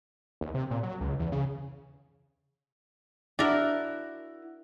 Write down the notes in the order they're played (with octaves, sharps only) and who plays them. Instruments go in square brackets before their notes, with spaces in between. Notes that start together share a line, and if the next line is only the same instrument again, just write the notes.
[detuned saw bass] D#2
C3
A#2
F#3
C#2
E2
C#3
[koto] D4 A#4 [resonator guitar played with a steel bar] E4 F#4